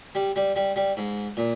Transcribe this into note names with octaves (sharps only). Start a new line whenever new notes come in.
G3
G3
G3
G3
G#2
A#2